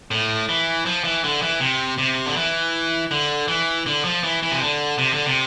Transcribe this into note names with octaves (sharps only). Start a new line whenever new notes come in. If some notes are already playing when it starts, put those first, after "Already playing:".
A2
E3
F3
E3
D3
E3
C3
C3
D3
E3
D3
E3
D3
F3
E3
E3
C3
D3
C3
D3
C3